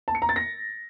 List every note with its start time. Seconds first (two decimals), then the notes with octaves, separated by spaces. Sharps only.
0.08 A5
0.15 C#7
0.22 A#5
0.29 A6
0.36 A#6